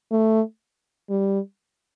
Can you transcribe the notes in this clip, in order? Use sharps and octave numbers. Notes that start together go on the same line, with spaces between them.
A3
G3